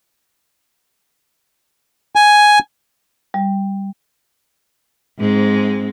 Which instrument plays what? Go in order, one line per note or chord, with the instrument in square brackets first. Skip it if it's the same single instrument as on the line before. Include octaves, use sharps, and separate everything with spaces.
[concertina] G#5
[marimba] G3
[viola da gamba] G#2 G#3 C4